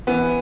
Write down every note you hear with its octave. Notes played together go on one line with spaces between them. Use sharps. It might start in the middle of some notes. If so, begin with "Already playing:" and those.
E3 B3